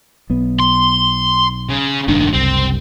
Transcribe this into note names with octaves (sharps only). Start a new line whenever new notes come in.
B1 B3
C6
C#3
F1 D2 G2 D#3 D4
F#1 C2 G3 C4